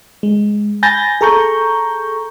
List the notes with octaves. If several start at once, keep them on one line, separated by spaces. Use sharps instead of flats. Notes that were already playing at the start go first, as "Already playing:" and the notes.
G#3
G#5 B5 G6 A6 A#6
G#4 A4 A#5 C#6 G6